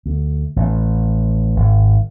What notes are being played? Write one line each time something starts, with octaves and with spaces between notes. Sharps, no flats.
D2
A1
G#1